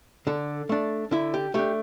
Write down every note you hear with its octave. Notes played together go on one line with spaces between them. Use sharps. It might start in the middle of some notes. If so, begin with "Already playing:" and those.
D3 A4
A3 D4
D3 E4
G4
A3 D4 G4